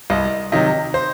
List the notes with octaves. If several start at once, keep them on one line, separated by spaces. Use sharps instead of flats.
C2 D#5
C3 D#3 F#3 D#5
C5